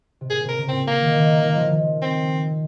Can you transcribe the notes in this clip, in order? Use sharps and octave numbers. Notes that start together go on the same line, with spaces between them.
C3
A#2 G#4
C3 A#4
C#3
A#2 C4
A#3
D#3
D#3
D#3
F3
D#3
C4